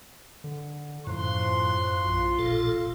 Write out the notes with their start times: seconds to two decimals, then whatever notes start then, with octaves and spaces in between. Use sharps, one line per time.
0.44 D3
1.07 F#2 A2 F3 C6
2.06 A#1 F4
2.39 E1 A#2 A4